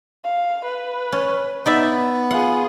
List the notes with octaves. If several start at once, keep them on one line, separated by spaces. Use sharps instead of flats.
F5
B4
C#4
B3 D#4 D5 E5
F4 G#4 F#5